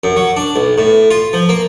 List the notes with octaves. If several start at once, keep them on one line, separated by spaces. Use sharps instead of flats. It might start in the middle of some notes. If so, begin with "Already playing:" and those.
F#2
F#3
D4
B1
A2
F4
F3
A#3